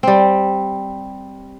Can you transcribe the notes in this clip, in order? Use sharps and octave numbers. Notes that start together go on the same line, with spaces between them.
G3 C4